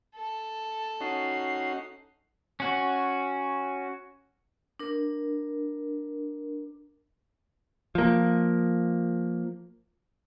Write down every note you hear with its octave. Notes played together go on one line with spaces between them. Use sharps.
A4
C#4 D#4 F#4 C7
C#4 F#4
D4 A#4
F3 A#3